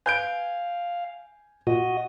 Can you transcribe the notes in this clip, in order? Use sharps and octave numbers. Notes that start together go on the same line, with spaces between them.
B4 F5 G#5 G6 D7
A#2 F#4 D#5